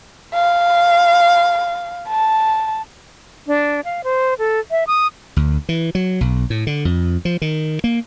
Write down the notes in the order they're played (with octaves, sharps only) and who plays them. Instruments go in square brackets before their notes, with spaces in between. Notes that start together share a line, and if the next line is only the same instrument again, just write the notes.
[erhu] F5
A5
[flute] D4
F5
C5
A4
E5
D#6
[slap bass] D2
E3
F#3
B1
A2
D3
F2
F3
D#3
A#3